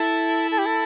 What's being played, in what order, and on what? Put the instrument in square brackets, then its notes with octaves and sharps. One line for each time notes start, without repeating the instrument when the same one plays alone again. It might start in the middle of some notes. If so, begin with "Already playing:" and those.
Already playing: [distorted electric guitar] E4 [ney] A4
[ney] A4
G4
A4